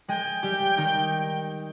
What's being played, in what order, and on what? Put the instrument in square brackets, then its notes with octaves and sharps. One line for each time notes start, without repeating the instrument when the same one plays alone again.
[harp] G#3 G#4 [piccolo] G5
[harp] G3 G4
D#3 D#4